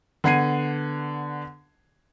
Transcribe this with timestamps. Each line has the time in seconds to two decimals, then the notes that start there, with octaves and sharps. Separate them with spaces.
0.24 D3 B3 F#5 G#6 C7 D#7